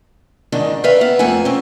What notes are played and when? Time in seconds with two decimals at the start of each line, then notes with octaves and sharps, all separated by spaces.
0.52 E2 G#2 D#3 D4 D#5
0.84 B4 D5 E5 F5 G5
1.01 B3 E4
1.19 F2 A3 A#3 F#5 G#5
1.45 C4 C#4